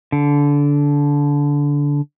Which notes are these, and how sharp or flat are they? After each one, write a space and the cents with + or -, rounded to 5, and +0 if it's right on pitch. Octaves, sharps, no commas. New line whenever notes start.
D3 -20